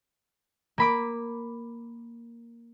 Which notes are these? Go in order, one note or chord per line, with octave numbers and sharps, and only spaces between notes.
A#3 B5 D6